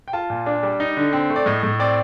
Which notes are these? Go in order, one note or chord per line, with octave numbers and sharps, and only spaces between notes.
G5
F4 A5
A#2
D4
G3
D#4
D3
C4
A3
D5
A2 D#5
A2
C4 D5